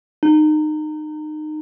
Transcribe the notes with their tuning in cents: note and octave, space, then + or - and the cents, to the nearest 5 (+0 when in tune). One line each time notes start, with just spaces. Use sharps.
D#4 -25